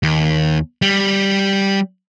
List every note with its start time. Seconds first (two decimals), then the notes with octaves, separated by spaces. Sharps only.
0.03 D#2
0.82 G3